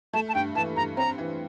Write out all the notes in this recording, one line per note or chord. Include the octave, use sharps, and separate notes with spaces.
A3 A5
A5
G2 G5
E3 A5
G2 A#5
C4 A#5
E3